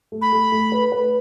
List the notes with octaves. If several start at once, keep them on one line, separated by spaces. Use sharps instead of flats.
A3
B5
A3
A3
B4
B4